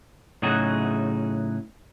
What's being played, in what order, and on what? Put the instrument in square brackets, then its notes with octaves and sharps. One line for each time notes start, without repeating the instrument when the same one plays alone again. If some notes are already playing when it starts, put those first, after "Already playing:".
[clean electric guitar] A2 C#3 F#3 D#4 F#4 G#4